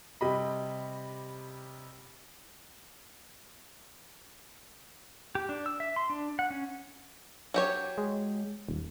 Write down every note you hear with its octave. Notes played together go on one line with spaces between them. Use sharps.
C3 G3 D#5 B5
G4
D4
E6
E5
C6
D4
F#5
C#4
F#3 G4 C#5
G#3
D#1